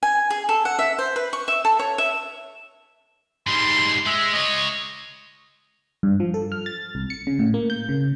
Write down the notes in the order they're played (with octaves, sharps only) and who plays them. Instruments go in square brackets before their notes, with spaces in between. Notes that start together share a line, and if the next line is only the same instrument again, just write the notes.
[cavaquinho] G#5
G#4
A4
F#5
E5
C5
B4
C#6
E5
A4
C#5
E5
[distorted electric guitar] G#2 G3 [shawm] C6
[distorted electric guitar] G#3 [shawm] E5
[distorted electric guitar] G#3 C#5 [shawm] D#5
[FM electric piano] G2
F3
A4
F6
A6
C2
C#7
C#3
A2
A#3
G6
C#3